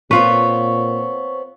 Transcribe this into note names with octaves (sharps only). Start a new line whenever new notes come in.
A#2 B3 C4 F4 B4 C#5 C#6